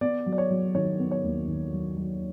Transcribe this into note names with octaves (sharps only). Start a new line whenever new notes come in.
B3 D5
F#3
D5
C#5
F#3
D#3 C#5
B3
C#5
D#2
D#3
F#3
F#3